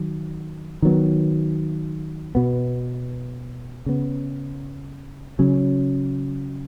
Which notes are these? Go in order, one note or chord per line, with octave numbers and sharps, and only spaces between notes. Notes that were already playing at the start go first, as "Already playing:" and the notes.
Already playing: D#3 F#3
D#3 F#3 B3
B2 B3
C#3 B3
C#3 F#3 C#4